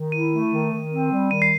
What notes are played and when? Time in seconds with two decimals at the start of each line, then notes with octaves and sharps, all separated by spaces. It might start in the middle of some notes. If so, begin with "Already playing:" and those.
Already playing: D#3
0.12 E4 D#7
0.32 A3
0.51 D#3
0.72 D#3
0.91 C4
1.12 G3
1.31 D#3 D#7
1.42 C7